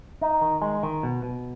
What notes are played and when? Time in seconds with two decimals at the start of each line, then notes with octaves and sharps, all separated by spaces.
0.21 D#4
0.41 D#3
0.62 G#3
0.83 D#3
1.03 B2
1.23 B2